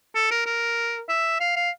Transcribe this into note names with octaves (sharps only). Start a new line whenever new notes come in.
A4
A#4
A#4
E5
F5
F5